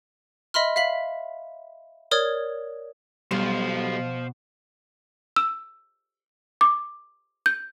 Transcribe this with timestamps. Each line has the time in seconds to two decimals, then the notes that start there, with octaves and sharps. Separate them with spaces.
0.54 D#5 E5 B5 C6 F6
0.76 E5 F5 B6 F#7
2.11 A#4 C#5 D5 D#6 F6 G#6
3.31 B1 B2 G3 F4 C5 F5
5.36 E6
6.61 D6
7.46 G6